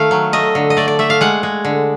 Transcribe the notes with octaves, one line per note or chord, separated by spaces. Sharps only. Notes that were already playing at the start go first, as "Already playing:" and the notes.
Already playing: D#3 A3 F5
F#3
A3 D#5
D3
D#5
A3 D5
D5
A3 E5
F5
G#3 F#5
G#3
D3